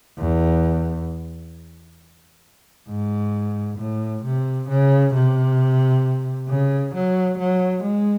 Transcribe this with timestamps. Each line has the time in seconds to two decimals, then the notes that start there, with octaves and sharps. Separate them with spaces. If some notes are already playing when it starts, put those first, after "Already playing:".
0.19 E2
2.89 G#2
3.79 A2
4.24 C3
4.69 C#3
5.14 C3
6.48 C#3
6.95 F#3
7.39 F#3
7.83 G#3